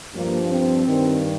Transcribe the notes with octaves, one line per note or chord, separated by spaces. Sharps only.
G2 F3 A#3
C4
G2 D#3